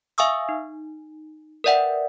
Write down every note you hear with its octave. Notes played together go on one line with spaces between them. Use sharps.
E5 F5 G#5 C#6 D#6 E6
D#4
A#4 B4 D5 E5 F#5 G5